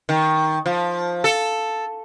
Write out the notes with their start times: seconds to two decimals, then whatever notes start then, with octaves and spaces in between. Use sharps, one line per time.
0.09 D#3
0.66 F3
1.24 A4